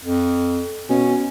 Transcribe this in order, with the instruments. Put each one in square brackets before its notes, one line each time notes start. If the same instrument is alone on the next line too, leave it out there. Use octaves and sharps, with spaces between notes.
[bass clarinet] F2
[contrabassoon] B2 [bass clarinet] C#4